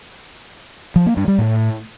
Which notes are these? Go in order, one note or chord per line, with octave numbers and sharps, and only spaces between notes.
F3
A#3
G2
G3
A2